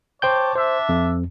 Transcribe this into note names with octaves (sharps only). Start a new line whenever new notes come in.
C5 C#5 G5 A5 D6 G6
D4 C5 E5
F2